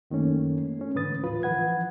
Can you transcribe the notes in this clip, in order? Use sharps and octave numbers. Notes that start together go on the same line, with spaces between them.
F#2 D#3 A3 A#3 C#4
A3 C#4
G#2 D3 E3 B4 D#6 A6
D#2 A2 F3 F4 B4
E3 F3 B4 F#5 G#6